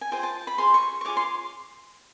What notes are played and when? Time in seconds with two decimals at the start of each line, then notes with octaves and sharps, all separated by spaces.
0.01 G#5
0.12 F4 G#4 C5 G5
0.23 A5
0.47 B5
0.58 F4 G#4 C5 C6
0.74 C#6
1.01 C#6
1.05 F4 G#4 C#5 D6
1.17 C6